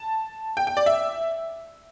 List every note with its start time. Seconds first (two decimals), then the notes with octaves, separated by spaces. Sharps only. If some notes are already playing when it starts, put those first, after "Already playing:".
Already playing: A5
0.57 G5
0.67 G5
0.77 D5
0.86 E5